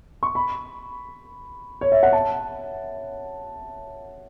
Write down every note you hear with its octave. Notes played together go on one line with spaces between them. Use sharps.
C#6
B5
C#5
E5
F#5
A5